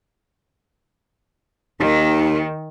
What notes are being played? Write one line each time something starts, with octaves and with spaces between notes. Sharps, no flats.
D#2 D#3